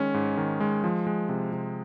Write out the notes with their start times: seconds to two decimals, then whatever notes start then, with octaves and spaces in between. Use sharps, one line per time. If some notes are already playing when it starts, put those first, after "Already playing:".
Already playing: D#3 G#3 C#4
0.14 G#2
0.37 D#3
0.60 G#3
0.84 F3
1.07 G#3
1.29 C3
1.53 C3